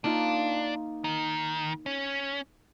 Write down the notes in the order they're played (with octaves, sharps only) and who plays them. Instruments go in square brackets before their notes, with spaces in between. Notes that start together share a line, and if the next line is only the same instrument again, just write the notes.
[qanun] A#3 D#4 F4 [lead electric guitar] D4
[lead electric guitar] D#3
C#4